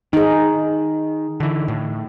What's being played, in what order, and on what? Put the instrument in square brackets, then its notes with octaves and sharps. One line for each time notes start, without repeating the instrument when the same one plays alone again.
[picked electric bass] D#3 [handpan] D#4 G#4
[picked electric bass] D3 E3
A2